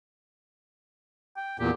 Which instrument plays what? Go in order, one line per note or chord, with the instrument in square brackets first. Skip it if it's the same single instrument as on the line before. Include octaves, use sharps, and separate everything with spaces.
[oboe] G5
[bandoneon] E2 A#2 [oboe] G4